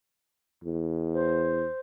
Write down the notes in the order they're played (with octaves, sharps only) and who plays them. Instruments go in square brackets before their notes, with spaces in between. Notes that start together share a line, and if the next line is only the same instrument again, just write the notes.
[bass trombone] E2
[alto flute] C5